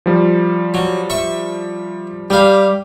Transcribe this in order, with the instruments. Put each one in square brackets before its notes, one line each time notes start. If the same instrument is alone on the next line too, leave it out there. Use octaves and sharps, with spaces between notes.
[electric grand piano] F3 G3
[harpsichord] F#3
E5 C#6
[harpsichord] G3 F5 [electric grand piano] G4